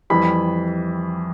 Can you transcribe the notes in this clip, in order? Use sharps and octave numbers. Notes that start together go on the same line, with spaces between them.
F2 E3 G3 B5